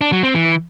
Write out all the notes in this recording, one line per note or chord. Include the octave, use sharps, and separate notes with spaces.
D4
F#3
C4
E3